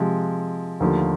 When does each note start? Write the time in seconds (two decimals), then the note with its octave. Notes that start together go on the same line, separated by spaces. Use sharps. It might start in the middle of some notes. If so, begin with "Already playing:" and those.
Already playing: C3 F3 G#3
0.80 D#2 D3 F3 A3